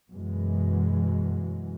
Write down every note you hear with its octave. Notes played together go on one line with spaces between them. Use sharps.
F#2 B2 E3 F#3 G#3